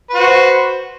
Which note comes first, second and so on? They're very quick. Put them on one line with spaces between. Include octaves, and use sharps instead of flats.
B4 F#4 C5